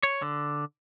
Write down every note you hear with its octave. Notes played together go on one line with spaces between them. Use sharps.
C#5
D3